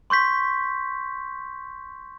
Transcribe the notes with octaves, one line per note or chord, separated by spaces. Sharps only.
C6 C#6 G6 B6